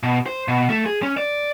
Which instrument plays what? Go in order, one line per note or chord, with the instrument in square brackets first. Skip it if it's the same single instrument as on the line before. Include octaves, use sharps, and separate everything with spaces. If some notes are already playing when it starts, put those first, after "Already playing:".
[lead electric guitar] B2
C5
B2
A3
G#4
C#4
D5